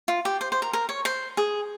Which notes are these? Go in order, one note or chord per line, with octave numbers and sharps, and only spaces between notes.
F4
G4
C5
C5
A#4
A#4
C#5
C5
G#4